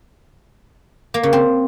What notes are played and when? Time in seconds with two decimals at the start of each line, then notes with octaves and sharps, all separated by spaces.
1.14 A#3
1.23 C#3
1.33 C4